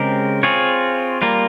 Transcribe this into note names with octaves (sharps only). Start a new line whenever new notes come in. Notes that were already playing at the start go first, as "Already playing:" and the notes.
Already playing: C#3 G#3 C4 G4 A#4
C4 F4 G#4 C#5
G3 A#3 F4